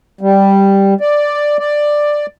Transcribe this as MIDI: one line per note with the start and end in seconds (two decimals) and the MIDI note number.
0.21 0.94 55
1.01 1.57 74
1.59 2.26 74